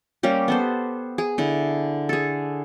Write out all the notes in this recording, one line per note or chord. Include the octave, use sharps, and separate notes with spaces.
G3 A#3 C#4 G4
B3 A4 C5
G#4
D3 E4
G#4 A4